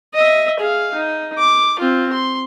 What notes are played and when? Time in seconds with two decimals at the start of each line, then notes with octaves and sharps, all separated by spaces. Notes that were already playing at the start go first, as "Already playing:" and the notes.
0.14 D#5 E5
0.59 G#4 F5
0.94 D#4
1.38 D6
1.79 C4 F4
2.12 C6